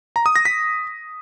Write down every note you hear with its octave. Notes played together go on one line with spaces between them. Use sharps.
A#5
D#6
A#6
B6